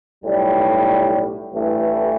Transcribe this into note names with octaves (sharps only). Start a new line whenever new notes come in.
B1 A2 G3
A1 G2 E3 A3